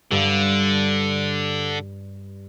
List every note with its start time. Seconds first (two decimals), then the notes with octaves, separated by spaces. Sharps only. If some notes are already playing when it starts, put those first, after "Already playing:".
0.11 G2 D3